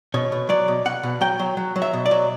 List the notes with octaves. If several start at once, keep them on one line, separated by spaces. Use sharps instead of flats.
B2 C#5
B2
F#3 D5
B2
B2 F#5
B2
F#3 G5
F#3
F#3
F#3
E5
B2
D5
F#3